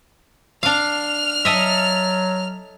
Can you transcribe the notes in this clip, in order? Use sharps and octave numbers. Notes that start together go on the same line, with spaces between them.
D4 F5 F6 F7
F#3 A4 D#5 E5